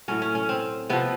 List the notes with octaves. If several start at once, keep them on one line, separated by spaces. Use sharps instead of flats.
A2 F#3 C#4
C#4
C#4
C4
C3 F3 B3